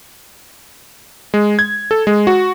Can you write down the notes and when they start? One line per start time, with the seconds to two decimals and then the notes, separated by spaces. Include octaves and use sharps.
1.34 G#3
1.59 G#6
1.91 A4
2.07 G#3
2.27 F#4